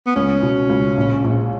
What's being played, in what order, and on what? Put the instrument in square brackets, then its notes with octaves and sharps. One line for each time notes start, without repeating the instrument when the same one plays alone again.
[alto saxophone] B3
[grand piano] C#2 [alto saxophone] C#4
[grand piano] B2
C#2
A#1
A#1